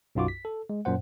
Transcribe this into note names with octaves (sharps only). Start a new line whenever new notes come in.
B1 F#2 D#4 F4 F#4 D6
B6
A4
G#3
F#2 A#2 C5 F#5